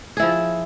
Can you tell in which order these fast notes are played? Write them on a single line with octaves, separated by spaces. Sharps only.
G#4 E4 F3